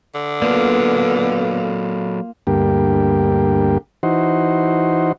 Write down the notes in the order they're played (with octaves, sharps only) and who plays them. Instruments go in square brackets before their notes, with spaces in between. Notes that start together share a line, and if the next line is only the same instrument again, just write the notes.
[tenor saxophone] D3
[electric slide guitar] F#3 A4 D5 [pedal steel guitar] A#3 F4 [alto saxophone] B3
[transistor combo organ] D2 G2 A#3 G4
E3 D#4 F#4 C5